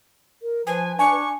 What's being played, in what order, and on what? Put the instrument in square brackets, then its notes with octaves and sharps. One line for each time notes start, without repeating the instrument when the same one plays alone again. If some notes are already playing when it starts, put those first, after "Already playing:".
[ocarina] A#4
[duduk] F3 [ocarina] B4 [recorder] G#5
[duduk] D4 [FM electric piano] G#5 [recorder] C#6